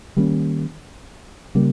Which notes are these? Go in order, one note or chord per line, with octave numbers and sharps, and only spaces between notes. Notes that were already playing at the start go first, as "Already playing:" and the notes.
D#3 G3 A#3 C#4
C#3 G3 A#3